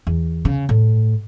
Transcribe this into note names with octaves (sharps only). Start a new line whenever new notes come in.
E2
C#3
A2